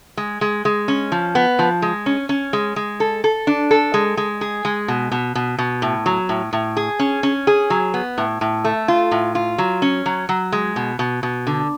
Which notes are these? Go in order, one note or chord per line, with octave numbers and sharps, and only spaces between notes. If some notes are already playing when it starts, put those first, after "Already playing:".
G#3
G#3
G#3
C#4
F3
B3
F3
G#3
C#4
C#4
G#3
G#3
A4
A4
D4
A4
G#3
G#3
G#4
G#3
B2
B2
B2
B2
A2
F#3
A2
A2
G#4
C#4
C#4
G#4
F#3
B3
A2
A2
A3
F4
A2
F4
F#3
C#4
F#3
F#3
G#3
B2
B2
B2
D3